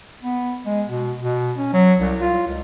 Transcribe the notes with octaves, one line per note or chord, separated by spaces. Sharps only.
B3
G#3
B2
B2
C#4
F#3
C2
F4
C#2